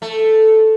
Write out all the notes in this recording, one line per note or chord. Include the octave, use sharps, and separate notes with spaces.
A3